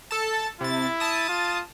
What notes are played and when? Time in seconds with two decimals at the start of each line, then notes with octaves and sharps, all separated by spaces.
0.11 A4 A5
0.61 C3 E4 A6
1.00 A5 D#6
1.29 F4